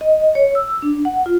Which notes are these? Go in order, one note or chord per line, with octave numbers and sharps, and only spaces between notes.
D#5
C#5
E6
D4
F#5
F4